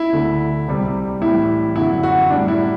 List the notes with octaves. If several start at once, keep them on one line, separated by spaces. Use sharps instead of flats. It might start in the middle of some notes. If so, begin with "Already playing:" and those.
Already playing: E4
D2 D3 A3
C2 C3 G3
A2 E3 G3 E4
F#2 D3 F#3 E4
F#4
A2 G3 D4
E4